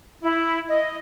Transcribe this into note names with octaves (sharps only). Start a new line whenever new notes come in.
E4
D#5